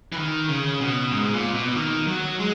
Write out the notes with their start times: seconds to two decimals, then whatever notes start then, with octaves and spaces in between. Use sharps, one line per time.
0.12 E3
0.17 D#3
0.49 C#3
0.81 B2
1.12 G#2
1.34 A#2
1.54 B2
1.76 D#3
2.07 F#3
2.39 G#3